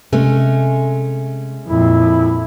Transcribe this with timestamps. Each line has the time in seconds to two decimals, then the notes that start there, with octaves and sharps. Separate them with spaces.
0.12 C3 G#3 A3 C#4
1.68 F2 A#2 E4